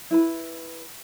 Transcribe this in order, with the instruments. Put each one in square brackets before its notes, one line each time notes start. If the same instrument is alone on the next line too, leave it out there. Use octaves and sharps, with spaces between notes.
[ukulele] E4 B4 B5